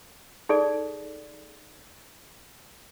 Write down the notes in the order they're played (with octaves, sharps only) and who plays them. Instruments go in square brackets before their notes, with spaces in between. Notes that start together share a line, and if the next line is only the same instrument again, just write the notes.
[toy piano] D#4 G#4 A4 D5